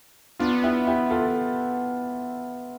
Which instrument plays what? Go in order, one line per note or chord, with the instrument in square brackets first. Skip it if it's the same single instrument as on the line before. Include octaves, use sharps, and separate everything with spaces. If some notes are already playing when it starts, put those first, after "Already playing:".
[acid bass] B3 [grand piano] D4 F4
[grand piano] E4 G4
E4 G4
F4 A4